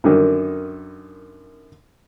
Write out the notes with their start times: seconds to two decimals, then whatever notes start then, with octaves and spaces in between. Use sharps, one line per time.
0.04 F#2 D3 D#3